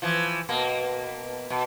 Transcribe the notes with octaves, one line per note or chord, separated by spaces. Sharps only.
E3 F3
B2 A#3
B2